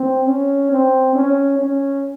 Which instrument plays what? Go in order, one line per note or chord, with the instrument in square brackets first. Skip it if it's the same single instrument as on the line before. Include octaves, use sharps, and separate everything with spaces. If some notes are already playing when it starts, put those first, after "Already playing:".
Already playing: [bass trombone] C4
C#4
C4
C#4
C#4